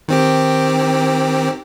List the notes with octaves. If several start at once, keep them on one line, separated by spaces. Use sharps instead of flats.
D#3 C4 G4